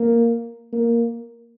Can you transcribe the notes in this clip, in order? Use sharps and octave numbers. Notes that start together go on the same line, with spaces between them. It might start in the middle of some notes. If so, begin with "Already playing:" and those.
Already playing: A#3
A#3